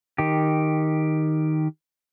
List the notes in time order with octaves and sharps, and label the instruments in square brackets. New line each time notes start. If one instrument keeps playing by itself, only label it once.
[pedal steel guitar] D#3 G4